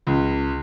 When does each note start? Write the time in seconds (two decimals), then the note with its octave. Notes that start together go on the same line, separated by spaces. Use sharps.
0.07 C#2